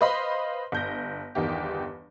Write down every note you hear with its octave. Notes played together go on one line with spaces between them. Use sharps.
B4 C5 D#5 F5 B5 C6
G1 G6 A#6
G1 E2 D#3 G4